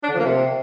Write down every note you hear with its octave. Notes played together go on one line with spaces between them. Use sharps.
D4
D3
F3
A#3
C3